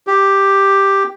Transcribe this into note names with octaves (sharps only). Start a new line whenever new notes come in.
G4